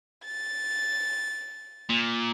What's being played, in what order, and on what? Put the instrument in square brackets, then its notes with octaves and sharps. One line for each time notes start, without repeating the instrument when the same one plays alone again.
[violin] A6
[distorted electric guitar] A#2